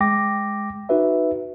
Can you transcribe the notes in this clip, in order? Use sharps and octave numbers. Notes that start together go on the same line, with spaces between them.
G#3 G5 D6 A#6
D#4 F#4 B4 E5